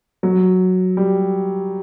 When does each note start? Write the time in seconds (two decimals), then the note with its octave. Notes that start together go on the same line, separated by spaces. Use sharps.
0.23 F#3
0.97 G3